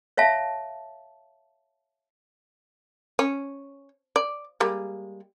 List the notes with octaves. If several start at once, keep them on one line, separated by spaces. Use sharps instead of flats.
C#5 E5 F5 A5
C#4
D5
G3 G#3 A#3